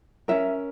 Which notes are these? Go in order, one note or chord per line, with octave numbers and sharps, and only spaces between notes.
C#4 F#4 A#4 E5